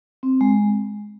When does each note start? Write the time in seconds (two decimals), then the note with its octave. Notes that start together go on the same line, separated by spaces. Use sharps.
0.23 C4
0.41 G#3